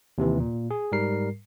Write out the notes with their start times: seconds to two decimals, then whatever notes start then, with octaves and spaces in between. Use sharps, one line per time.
0.18 D#2 C3 E3
0.40 A#2
0.71 G#4
0.92 G#2 G3 A#4 C7